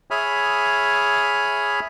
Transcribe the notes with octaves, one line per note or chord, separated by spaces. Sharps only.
G#4 C#5 E5 B5 D#6 F6